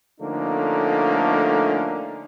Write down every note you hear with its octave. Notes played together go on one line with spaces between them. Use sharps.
D3 F3 A3 A#3 C#4 D#4